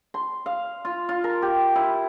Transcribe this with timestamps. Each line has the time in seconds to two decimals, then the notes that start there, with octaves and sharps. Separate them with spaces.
0.14 C6
0.46 F5
0.85 F4
1.09 F4
1.24 A#4
1.42 G4
1.76 E4